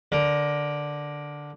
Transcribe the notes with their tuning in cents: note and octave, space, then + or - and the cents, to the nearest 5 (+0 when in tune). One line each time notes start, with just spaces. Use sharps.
D3 +0 A#4 +15